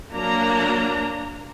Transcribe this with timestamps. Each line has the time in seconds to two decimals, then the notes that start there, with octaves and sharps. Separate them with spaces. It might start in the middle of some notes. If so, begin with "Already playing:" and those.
0.12 F#3 A#3 D4 A#5